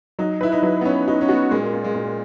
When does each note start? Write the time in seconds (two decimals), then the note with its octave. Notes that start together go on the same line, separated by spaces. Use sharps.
0.19 F#3 D#4
0.41 E4 B4
0.52 D#4
0.63 F#3
0.81 B3
0.85 C#4 B4
1.07 D#4 F#4
1.21 C#4
1.28 B3 F#4
1.51 A#2 G#3
1.73 A#2
1.84 G#3
1.95 A#2